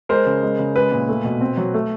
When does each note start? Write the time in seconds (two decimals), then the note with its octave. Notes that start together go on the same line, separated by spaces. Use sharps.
0.09 G#3 A#4 C5
0.26 C#3
0.43 G#3
0.59 C#3
0.76 G#3 B4
0.92 A#2
1.08 A3
1.24 B2
1.41 C4
1.57 F#3
1.74 A3